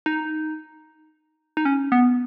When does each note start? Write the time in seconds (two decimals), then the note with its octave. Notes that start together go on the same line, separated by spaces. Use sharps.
0.06 D#4
1.57 D#4
1.65 C#4
1.92 B3